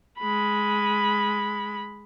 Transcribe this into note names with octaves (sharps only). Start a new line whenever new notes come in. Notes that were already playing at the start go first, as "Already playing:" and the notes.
G#3 B5